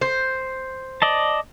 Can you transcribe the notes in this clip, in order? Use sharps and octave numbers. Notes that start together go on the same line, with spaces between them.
C5
D5 D#5 A5